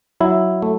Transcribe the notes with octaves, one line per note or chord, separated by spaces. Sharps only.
F#3 E4
A3